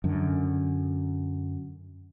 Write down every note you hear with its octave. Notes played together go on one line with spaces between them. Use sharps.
F#2 D3